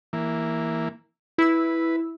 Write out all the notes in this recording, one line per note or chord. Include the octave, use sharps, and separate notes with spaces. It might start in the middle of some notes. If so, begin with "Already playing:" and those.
E3 A#3
E4 B4 E6